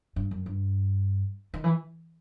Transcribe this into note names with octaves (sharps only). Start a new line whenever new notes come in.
G2
F#2
G2
D#3
E3